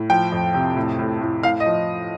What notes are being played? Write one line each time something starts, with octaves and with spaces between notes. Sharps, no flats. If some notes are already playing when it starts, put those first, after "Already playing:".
Already playing: A2
F3 G5
F2
C3
A2
A2
A2
A2 F5
D#5
F3